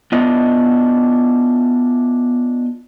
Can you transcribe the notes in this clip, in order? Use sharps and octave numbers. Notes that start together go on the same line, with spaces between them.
B3 D4 E4 F4 D#5